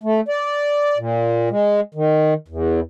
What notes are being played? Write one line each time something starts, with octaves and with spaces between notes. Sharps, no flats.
A3
D5
A#2
G#3
D#3
E2